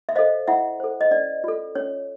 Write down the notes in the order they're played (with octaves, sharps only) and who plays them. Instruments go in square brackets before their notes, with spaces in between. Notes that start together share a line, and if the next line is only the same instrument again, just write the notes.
[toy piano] E5
A4 C5 D#5 F5
E4 E5 F#5
A4 C5
D#5
C#4 D5
F4 A4
C#4 C#5